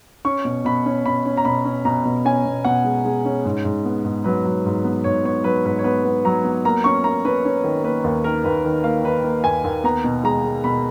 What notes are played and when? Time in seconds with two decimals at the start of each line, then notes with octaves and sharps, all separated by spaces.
0.25 C#4 C#6
0.45 B2
0.65 B2 B5
0.86 C#4
1.06 B2 B5
1.25 C#4
1.37 A#5
1.45 B2 B5
1.65 C#4
1.85 B2 A#5
2.05 B2
2.25 C#4 G#5
2.46 B2
2.65 B2 F#5
2.84 G#3
3.05 G#3
3.25 C#4
3.45 G#2
3.65 G#2
3.85 B3
4.05 G#2
4.24 F#3 B4
4.46 F#3
4.65 G#2
4.84 B3
5.04 G#2 C#5
5.24 B3 C#5
5.44 F#3 B4
5.65 G#2 B4
5.79 C#5
5.84 B3 B4
6.05 B3
6.25 F#3 A#5
6.44 B3
6.65 A#3 A#5
6.84 C#4 C#6
7.04 A#3 A#5
7.25 C#4 B4
7.45 C#4
7.64 D#3
7.84 A#3 B4
8.04 D#2
8.24 D#3 A#4
8.44 D#2 B4
8.65 D#3
8.84 A#3 F5
9.04 D#3 B4
9.24 A#3
9.44 D#2 G#5
9.64 D#2
9.84 B3 A#5
10.04 B2
10.24 G#3 A#5
10.44 G#3
10.64 B2 B5